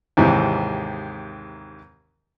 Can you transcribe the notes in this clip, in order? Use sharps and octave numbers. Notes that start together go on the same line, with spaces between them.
D#2 G#2 C3 E3